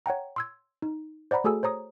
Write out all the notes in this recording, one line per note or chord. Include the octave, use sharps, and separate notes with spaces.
C#5 F#5 G5 A#5
C6 E6 G#6
D#4
C5 D5 F#5 A#5 B5
A3 F#4 G#4 A4 G#5 E6
C5 C#5 A#5 D#6